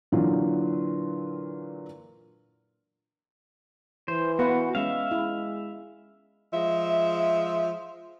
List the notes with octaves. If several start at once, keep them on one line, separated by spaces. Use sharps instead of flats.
A#2 D3 E3 F#3 F4
E3 C5
B3 F#4 B4 F5
G#3 C#4 E5 F5
G#3 E4
F3 G#3 E5